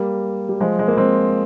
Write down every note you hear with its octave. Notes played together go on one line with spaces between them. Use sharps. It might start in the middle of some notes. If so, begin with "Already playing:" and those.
Already playing: G3 A#3
G3
F3 G#3
G#3
A#3
G#3 C4